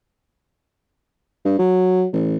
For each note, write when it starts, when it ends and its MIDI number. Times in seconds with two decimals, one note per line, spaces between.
1.45 1.55 43
1.59 2.06 54
2.13 2.37 33